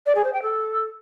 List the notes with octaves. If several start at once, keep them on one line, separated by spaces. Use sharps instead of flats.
D5
G#4
C5
G5
A4